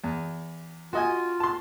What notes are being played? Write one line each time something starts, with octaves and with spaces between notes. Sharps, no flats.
E2
F4 F#4 D#5 G#5
A5 C6